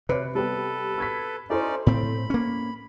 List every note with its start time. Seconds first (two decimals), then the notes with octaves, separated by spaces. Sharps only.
0.09 C3 B4 C#5
0.35 G3 B3 G4 A4 B4
0.98 E6 G#6 B6
1.50 C#4 D#4 E4 A4 C5 D5
1.86 A2 C4 B5
2.30 A#3 C#4